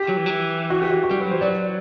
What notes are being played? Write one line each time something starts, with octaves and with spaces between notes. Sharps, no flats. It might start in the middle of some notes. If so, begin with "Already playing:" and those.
Already playing: G4
F#3
E3
F#3
E3
F#4
G4
F#4
F#4
G3 G4
F#3 B4
E3 C5
F#3 D5